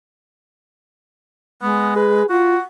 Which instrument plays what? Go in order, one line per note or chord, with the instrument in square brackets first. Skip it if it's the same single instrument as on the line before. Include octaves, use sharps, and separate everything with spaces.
[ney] G#3 [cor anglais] B3
[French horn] G#4 [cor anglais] B4
[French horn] F4 [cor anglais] F#4 [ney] F#5